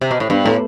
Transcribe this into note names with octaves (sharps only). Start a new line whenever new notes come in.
C3
B2
A2
G2 B3
A2 A3